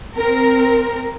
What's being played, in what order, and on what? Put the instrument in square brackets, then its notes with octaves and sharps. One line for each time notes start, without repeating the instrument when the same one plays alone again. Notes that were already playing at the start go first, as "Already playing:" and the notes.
[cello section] C4 A#4